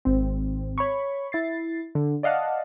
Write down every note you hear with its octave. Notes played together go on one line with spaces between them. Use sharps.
G#1 C4
C#5 B5 C#6
E4 A6 C7
D3
D5 D#5 F5 F#5 A5